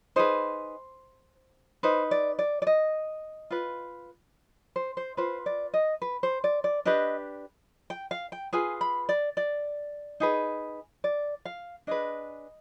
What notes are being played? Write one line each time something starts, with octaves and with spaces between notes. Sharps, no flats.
D#4 G#4 B4 C5
D#4 B4 C5
D5
D5
D5
D#5
F4 B4
C5
C5
F4 B4 C5
D5
D#5
B4
C5
D5
D5
D4 G4 B4 D#5
G5
F5
G5
F4 G#4 B4 G#5
B5
D5
D5
D#4 G#4 B4
D5
F5
D4 G#4 B4 D#5